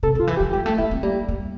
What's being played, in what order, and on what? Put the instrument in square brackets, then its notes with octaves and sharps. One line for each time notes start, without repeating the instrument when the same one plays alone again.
[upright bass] C3 [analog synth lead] A4
[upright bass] D3 [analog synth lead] F4
[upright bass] E3
[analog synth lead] G4
[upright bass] F3
[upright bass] G3 [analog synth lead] G4
[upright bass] A3
[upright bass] A#3 [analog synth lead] E4
[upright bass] C4
[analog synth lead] G3 [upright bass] A#3
[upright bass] A#3